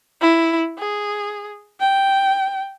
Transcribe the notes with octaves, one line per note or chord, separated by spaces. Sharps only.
E4
G#4
G5